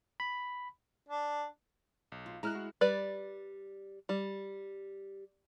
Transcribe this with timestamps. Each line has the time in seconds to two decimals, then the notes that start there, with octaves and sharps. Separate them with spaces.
0.20 B5
1.08 D4
2.12 B1
2.26 F4
2.43 G#3 E4 A#5 F6 F#6
2.55 F#4
2.81 G3 B4 D5
4.09 G3